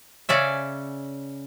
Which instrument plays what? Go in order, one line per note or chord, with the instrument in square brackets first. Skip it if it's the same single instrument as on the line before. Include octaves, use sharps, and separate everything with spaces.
[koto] C#3 C#4 D5 E5